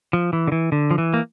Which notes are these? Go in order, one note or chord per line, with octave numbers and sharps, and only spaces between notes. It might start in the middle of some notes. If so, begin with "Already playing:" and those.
F3
E3
D3
E3
D3
F3
E3
A#3